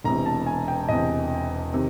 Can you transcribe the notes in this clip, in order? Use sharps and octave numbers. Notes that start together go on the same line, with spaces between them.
E1 E2 C3 A#5
A5
G#5
G5
E1 E2 C3 D#5
C3 D#3